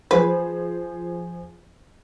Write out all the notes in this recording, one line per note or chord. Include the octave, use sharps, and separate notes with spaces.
F3 G#4 B4 C5